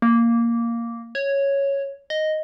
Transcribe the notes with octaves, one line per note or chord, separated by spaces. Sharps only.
A#3
C#5
D#5